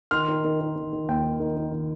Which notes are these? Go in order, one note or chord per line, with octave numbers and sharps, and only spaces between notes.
D#3 C6 F6
D#3
D#3
D#3
D#3
D#3
D#2 G5
D#2
D#3
D#3
D#3